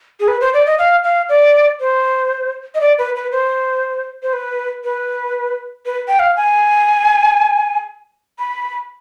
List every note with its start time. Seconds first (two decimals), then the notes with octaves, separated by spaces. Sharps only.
0.20 G#4
0.28 B4
0.41 C5
0.54 D5
0.66 D#5
0.79 F5
1.04 F5
1.29 D5
1.80 C5
2.75 D#5
2.81 D5
2.98 B4
3.16 B4
3.32 C5
4.23 C5
4.33 B4
4.84 B4
5.86 B4
6.08 G5
6.19 F5
6.37 G#5
8.39 B5